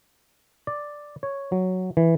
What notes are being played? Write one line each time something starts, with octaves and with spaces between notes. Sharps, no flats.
D5
C#5
F#3
E3